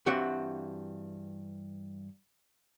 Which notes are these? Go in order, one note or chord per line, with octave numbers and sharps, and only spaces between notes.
G2 E3 C4 F#4 E5 F#5